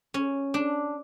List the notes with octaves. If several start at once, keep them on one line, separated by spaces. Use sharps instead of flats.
C#4
D4